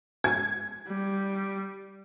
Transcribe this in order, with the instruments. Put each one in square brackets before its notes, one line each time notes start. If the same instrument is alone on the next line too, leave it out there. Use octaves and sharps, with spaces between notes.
[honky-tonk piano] G#6
[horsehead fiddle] G3